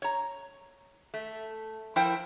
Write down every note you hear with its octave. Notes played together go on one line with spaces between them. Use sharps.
C#5 A#5
A3
F3 E4 A#4 C5 G5